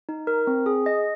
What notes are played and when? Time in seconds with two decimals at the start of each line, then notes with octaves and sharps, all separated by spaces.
0.09 D#4
0.27 A#4
0.47 C4
0.66 G#4
0.86 D#5